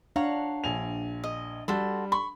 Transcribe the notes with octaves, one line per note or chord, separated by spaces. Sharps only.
D4 C#5 F5 F#5 A#5
A#1 G#5 F7
D#5
G3 F#4 A4 C6
B5 C#6